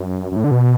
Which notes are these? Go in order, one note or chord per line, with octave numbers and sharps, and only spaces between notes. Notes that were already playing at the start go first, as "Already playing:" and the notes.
Already playing: F#2
F#2
A2
D3
B2